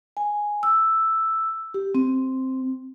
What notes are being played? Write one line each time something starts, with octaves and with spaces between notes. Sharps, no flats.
G#5
E6
G4
C4